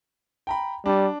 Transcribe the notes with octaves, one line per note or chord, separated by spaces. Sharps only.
G5 A#5 B5
G3 D4